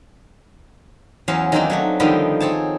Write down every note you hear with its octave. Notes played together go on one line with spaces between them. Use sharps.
E2 F#3 C#4 C5 F5
D#3 F#3 A#3 C4 D4 D#4
F#3 A3 F#4
D3 D#3 F3 G3 B3 D#4
C4 G#4 C#5 A5